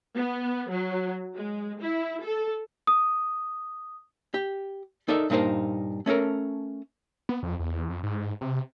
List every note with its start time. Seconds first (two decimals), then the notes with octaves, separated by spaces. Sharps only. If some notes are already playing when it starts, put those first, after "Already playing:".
0.16 B3
0.70 F#3
1.35 G#3
1.81 E4
2.23 A4
2.87 D#6
4.34 G4
5.08 D#4 A4 A#4 D5 E5
5.30 G2 A#2 D#4 A#4 C5 A5
6.06 A3 C#4 A4 A#4
7.29 B3
7.43 F2
7.59 E2
7.90 F2
8.03 G#2
8.41 C3